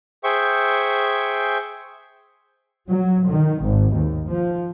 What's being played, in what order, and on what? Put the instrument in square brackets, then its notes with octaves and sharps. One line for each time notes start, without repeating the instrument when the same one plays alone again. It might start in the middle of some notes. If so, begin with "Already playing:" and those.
[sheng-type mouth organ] G#4 C5 E5 G5 C#6
[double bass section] F#3
D#3
G#1
D#2
F3